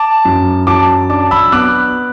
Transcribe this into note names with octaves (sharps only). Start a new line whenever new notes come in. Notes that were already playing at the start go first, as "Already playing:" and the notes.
Already playing: A5 D6
F#2
F#3 A5 D6
D4 A5 D6
B5 E6
B3 D6 F#6